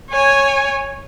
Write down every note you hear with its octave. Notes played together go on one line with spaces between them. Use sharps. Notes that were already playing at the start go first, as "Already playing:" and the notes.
C#5 G#5